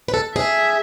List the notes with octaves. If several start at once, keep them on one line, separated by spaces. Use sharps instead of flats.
B4
A4
G#4 E5